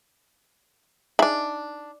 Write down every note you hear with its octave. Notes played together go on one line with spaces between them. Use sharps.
D4 D#4 G#4 E5 B5